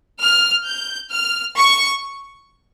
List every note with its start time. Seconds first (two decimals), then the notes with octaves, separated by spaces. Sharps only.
0.20 F6
0.65 G6
1.11 F6
1.57 C#6